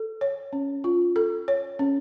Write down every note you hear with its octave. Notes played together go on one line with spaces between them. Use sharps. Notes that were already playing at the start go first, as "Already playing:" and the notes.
Already playing: A4
C#5
C#4
F4
A4
C#5
C#4